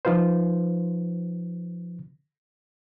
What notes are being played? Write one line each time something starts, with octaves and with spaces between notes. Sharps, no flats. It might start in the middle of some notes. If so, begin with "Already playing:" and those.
F3 D#4 F4 B4 C5